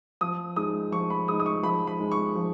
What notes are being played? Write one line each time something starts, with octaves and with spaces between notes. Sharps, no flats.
F3 D#6
G#3 D#4 D#6
F3 C#6
B5
G#3 D#4 D#6
D#6
C#6
F3 B5
B5
G#3 D#4
C#6
F3